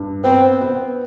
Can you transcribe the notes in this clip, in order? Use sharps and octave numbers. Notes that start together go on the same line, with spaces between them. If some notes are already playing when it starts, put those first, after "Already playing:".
Already playing: G2
B3 C4
B3